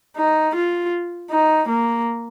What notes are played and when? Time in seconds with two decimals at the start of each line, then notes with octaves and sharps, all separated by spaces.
0.16 D#4
0.55 F4
1.30 D#4
1.68 A#3